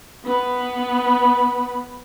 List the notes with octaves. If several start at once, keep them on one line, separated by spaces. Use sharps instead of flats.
B3 B4